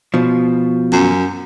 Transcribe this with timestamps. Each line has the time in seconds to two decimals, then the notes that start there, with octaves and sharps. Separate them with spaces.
0.14 B2 F3
0.92 F#2